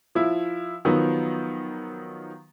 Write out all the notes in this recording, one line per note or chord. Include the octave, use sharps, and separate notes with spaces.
F3 E4
D#3 F3 F#3 B3